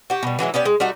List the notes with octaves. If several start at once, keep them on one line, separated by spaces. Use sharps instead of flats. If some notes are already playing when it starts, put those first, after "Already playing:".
F#4 G4
B2 G3
E3 F#3 G#3 E4
B3 C#4 G4 D5
G#3
G3 A3 D#4 F#4